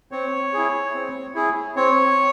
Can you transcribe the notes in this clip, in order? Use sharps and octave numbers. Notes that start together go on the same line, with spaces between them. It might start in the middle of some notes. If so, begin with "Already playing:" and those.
C4 C#5
E4 G#4
C4
E4 G#4
C4 C#5